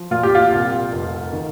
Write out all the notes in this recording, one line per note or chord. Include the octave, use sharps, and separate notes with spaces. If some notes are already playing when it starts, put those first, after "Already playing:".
Already playing: F3
A#2 F4
G4
F4
C2
F1
D#3